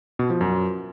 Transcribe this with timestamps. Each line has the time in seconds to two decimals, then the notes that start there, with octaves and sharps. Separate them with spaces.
0.19 B2
0.30 F3
0.41 F#2